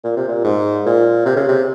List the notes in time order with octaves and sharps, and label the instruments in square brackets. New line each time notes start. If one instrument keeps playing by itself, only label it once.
[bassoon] A#2
C3
A#2
G#2
A#2
C3
C#3
C3